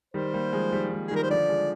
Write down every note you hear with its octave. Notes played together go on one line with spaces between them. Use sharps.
D#3 G3 C5
G3 A#3
F3 G#3
D#3 G3
D#3 G3
G#4
D#3 G3 A#4
C5
D3 F3 D5
F3 G#3